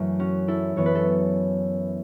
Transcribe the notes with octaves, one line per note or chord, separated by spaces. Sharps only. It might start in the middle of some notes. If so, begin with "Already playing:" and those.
Already playing: F#2 E3 A3
C#4 F#4
E4 A4
F#2 E3 B3 C#5
B4
A4